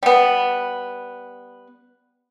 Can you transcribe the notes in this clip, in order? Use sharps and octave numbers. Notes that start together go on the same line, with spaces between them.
G3 B3